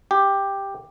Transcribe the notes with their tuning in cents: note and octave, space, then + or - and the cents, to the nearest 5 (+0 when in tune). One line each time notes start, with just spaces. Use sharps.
G4 +5